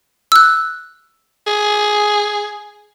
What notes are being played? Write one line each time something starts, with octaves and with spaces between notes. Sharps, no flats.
E6 F#6
G#4